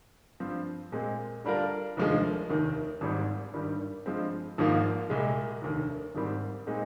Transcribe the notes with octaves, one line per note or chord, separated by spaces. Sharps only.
G2 F3 C4
A#2 G#3 C4
D3 G3 D4 F4 A#4
F1 D#2 D3 F3 G#3
F1 D#2 D#3
G#1 G#2 G3 C4
G#1 G2 D#3 G3
G2 F3 G#3 C4
G#1 G#2 F3 A#3 F4
C2 A#2 G#3
F1 D#2 D3
G#1 G#2 D#3 G3 C4
A#2 G#3 C4 D#4